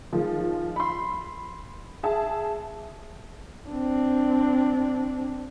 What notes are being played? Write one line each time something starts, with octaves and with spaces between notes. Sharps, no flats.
D#3 F3 G#3
B5 C6
G#4 E5 A5
C4 D4